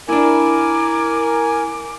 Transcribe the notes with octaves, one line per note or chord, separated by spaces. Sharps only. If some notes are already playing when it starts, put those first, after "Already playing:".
D4 E4 A#4 G#5 D6